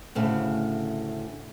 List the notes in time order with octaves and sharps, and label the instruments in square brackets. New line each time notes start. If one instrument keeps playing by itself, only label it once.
[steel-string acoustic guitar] D2 A2 C#3